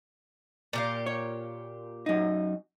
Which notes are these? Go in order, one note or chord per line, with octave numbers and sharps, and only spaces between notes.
A#2 G4 F5
C#5
F#2 D#4